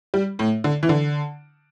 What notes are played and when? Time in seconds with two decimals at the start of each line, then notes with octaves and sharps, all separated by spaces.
0.14 G3
0.39 A2
0.64 D3
0.83 E3
0.89 D3